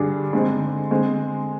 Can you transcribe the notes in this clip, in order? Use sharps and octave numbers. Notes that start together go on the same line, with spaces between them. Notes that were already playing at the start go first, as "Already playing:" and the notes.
Already playing: G2 D3 G3 D4 G#4
D3 G#3 C4 D#4
D3 G#3 C4